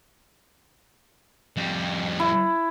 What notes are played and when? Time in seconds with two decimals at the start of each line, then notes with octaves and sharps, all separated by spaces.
1.57 F2 G3
2.20 E4